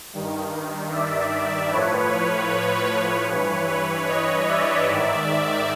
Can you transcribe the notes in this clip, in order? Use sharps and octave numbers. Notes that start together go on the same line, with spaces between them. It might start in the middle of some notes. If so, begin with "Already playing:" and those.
G2 D#3
D5 E5
A2 F3 B4 C#5
G2 E3 B4 C#5
B4 C#5
C#5 D#5
D5 E5
G#2 D#3